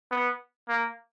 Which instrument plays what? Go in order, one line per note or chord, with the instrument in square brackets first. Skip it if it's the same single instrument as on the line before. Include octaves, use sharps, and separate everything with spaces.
[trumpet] B3
A#3